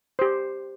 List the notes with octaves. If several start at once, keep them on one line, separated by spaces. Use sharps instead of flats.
G4 C5